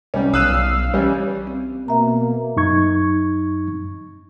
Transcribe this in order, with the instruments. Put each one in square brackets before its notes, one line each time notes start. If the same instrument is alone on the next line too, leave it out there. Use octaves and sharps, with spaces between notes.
[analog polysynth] C2 G3 [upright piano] C#4
[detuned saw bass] B1 [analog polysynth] F5 E6 [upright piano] D#6 F#6 D#7
[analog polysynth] E3 G3 [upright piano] C#4
[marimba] C4
[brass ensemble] B2 A#3 [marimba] E5 A#5
[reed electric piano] F#2 D#4 C#6 G#6